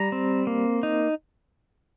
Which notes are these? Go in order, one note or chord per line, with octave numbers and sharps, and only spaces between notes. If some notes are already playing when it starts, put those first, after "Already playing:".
Already playing: G3 A#5
C4
A#3
D#4